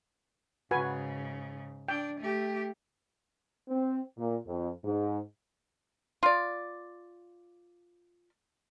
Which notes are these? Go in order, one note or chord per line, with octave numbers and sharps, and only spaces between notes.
G#2 C#3 F#4 B4 G#5
D4 G5
A3 G4
C4
A#2
F2
G#2
F4 D5